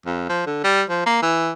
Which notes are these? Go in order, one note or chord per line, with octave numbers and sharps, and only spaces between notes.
F2
F3
D3
G3
F3
A#3
E3